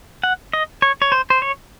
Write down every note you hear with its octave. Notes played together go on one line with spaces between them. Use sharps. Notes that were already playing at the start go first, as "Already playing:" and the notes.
F#5
D#5
C#5
C#5
C5
C5
C#5